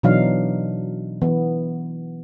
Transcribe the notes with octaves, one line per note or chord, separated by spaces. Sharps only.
B2 E3 F#3 D4 D#4 F5
E3 B3